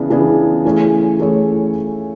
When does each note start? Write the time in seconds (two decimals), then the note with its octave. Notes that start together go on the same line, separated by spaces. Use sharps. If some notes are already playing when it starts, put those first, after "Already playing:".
Already playing: C#3 E3 B3 D4 G#4
0.10 C#3 E3 B3 D4 G#4
0.65 E3 A3 C#4 G#4 C#5
1.19 E3 A3 C#4 G#4 C#5